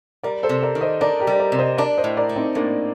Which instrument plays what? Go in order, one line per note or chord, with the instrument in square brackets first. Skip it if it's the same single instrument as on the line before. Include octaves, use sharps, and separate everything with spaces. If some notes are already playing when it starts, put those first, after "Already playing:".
[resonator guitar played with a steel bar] G3 [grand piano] A#4 D5
[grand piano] A4 C5
[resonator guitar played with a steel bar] C3
[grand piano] A#4 D5
[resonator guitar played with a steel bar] D#3
[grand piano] C5 D#5
[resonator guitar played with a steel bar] D4 [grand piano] A#4 D5
[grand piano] G4 A#4
[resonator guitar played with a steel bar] G3
[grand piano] A#4 D5
[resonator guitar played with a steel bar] C3
[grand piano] C5 D#5
[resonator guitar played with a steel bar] D4 [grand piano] A#4 D5
[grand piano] C5 D#5
[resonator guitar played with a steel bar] A2
[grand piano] A#4 D5
[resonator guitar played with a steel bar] A3
[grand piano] C4 D#4
[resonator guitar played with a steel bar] A2 [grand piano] A#3 D4